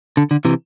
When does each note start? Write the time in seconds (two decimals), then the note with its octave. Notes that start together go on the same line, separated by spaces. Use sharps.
0.17 D3
0.31 D3
0.45 C3 E3